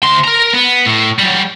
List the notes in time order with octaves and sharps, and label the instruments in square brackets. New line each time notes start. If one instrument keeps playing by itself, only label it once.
[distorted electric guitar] D2 C6
A#4 A#5
B3
A2
F#3 G3